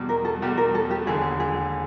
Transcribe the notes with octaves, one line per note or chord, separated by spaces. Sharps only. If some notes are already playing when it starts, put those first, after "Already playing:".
Already playing: E2 B2 G3
A#4
A4
E2 B2 G3 G4
A#4
A4
G4
E1 D#2 D3 G#4
G#4